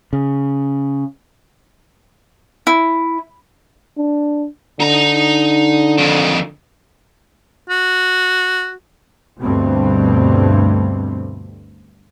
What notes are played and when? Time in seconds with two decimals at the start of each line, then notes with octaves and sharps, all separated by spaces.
0.13 C#3
2.67 E4
3.98 D4
4.80 D3 D#4 A#5
5.98 F2 D#3
7.70 F#4
9.41 D2 G2 B2 G3 A3 C4